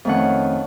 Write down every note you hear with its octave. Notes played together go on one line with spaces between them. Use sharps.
F2 D#3 A3 C#4 F#5